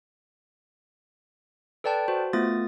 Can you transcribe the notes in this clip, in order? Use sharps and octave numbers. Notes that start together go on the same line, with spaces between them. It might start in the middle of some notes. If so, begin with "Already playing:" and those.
A4 B4 D5 G5 A5
F#4 C5
A3 B3 F4 D#6 A6